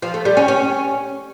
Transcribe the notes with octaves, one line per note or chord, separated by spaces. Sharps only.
F3
A3
G3
C#4
C#4